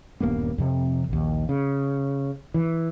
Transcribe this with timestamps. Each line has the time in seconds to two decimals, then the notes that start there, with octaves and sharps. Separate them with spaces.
0.20 D#1 G2 A#3 B3
0.58 F2 C3
1.09 A#1 D#2
1.49 C#3
2.54 E3